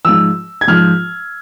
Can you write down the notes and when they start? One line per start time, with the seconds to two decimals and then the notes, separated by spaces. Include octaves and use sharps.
0.05 G#2 F3 E6
0.61 G#6
0.68 G#2 F3 F6